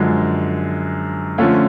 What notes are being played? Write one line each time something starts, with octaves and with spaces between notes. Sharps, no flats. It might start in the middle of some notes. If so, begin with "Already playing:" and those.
Already playing: F#2 D3 F3 G#3
D3 F3 A3 C#4 F4